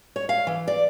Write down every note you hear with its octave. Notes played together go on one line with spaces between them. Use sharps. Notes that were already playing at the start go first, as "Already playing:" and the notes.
C#5
F5
E3
D5